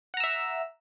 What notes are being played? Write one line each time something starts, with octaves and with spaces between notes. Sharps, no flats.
E5 F#5 A#5 E6